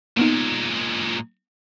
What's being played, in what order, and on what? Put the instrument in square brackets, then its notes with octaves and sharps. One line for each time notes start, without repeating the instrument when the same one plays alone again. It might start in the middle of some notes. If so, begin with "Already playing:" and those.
[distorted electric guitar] A#2 G#3 [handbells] A#3 B3 D#4